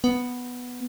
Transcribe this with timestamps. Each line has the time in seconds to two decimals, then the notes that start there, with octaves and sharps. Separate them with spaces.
0.04 B3